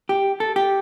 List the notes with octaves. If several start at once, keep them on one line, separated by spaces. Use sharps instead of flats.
G4
A4
G4